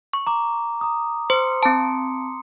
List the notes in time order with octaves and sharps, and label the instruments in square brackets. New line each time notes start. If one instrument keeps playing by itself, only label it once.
[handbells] C#6
[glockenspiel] A#5 D6
A#5 D#6
[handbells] C5 [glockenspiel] C6 C#7
[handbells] C4 A5